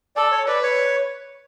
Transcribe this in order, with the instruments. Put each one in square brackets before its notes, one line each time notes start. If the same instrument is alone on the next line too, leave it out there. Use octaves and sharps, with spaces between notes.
[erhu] A4 [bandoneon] D5
[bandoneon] C#5
[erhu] B4 [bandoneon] D5
[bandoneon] C#5